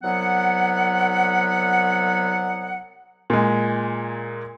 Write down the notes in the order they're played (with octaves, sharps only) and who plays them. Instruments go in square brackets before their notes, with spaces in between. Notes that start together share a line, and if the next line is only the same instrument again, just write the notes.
[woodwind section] C2 F#3 B3 F#5
[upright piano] A#2 G#3